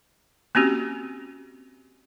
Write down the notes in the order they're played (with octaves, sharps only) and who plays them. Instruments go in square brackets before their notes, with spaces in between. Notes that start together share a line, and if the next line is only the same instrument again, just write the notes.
[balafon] A#3 C4 C#4 F#4 G4